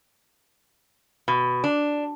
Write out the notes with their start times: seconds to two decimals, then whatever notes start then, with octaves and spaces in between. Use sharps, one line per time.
1.28 B2
1.64 D4